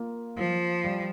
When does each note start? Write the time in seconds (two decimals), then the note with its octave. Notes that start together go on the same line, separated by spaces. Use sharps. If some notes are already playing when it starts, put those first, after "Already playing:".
Already playing: A#3 F4
0.37 F3 F4
0.84 G3